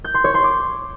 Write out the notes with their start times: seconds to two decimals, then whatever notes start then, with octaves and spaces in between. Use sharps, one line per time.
0.04 G6
0.14 C6
0.24 C#5
0.34 C6
0.44 D6